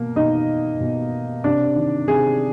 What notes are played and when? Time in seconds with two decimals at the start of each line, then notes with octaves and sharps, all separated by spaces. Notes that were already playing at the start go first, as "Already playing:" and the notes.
Already playing: B2 A#3
0.16 B2 D#4 D#5
0.80 B2
1.44 C3 D4 D5
1.76 D#3
2.07 C3 G#4